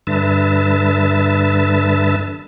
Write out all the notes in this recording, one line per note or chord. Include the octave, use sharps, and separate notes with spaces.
G2 D3 B4 E5 A5